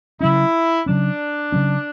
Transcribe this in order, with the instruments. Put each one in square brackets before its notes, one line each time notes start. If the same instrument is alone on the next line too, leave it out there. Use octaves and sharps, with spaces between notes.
[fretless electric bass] C#3 F#3 C#4 [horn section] E4
[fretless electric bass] C#3 F#3 C#4 [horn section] D4
[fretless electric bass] C#3 F#3 C#4